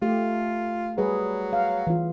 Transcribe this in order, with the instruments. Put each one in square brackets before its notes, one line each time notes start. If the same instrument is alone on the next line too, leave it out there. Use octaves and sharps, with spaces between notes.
[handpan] A3 G4 [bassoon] F4
[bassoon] F#3 [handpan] G3 G#4 B4
[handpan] F5
E3 F4